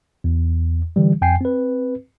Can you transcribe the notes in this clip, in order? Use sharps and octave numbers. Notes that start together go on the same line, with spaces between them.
E2
D3 E3 G3
F2 G5 G#5 C7
C4 B4